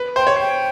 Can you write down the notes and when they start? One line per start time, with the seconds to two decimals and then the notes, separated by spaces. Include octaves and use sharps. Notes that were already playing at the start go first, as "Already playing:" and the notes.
Already playing: B4
0.16 C5 G5
0.27 C#5
0.37 C5 G5